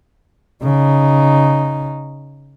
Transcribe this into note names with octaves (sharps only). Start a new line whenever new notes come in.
C#3 D#4